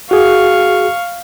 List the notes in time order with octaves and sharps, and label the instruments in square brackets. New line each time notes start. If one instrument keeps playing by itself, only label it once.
[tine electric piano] F#4 G#4 [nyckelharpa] F5 C#6